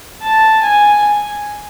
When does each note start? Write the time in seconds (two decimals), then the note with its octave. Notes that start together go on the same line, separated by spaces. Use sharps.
0.23 A5
0.63 G#5